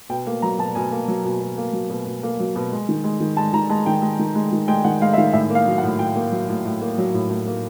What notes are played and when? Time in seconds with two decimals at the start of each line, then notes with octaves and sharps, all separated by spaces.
0.09 B2 G5
0.27 A#3
0.42 F#3 A#5
0.58 B2 A5
0.75 B2 G#5
0.92 A#3
1.08 F#3
1.25 B2
1.41 B2
1.58 A#3
1.73 F#3
1.90 B2
2.06 B2
2.23 A#3
2.40 F#3
2.56 B2
2.72 G#3
2.89 D#3
3.04 G#3
3.20 D#3
3.37 G#3 A5
3.53 D#3 A#5
3.70 G#3 A5
3.86 D#3 G5
4.02 G#3
4.19 D#3
4.35 G#3
4.52 D#3
4.68 G#3 G5
4.84 D#3 F#5
5.02 G#3 F5
5.13 E5
5.18 D#3 F5
5.33 A2 E5
5.50 A#3
5.55 F5
5.67 F#3
5.78 F#5
5.83 A2
5.99 A2 G5
6.16 A#3
6.32 F#3
6.49 A2
6.65 A2
6.81 A#3
6.98 F#3
7.14 A2
7.30 A2
7.47 A#3